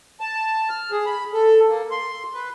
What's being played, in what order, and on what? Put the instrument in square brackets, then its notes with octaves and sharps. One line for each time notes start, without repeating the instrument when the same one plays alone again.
[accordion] A5
F6
G#4
B5
A4
A#3
C6
B4